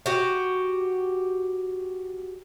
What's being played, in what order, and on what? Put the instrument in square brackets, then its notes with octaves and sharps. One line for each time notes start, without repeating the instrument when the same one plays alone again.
[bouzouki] F#4 G4